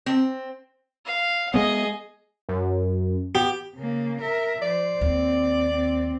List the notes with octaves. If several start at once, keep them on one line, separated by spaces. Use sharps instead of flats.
C4
F5
G#3 A3 B3 G#4 D#5
F#2
B3 G4
C#3 A#3
A#4 E5
F3 C5 D5
D#2 C4
C4